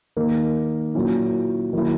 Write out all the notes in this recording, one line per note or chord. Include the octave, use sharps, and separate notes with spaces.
D#3 A#3 D#4
A#2 F#3 C#4 E4
D#3 F#3 A#3 E4